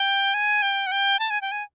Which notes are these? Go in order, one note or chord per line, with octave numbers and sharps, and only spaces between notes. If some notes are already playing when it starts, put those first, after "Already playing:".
Already playing: G5
G#5
G5
F#5
G5
A5
G#5
G5
G#5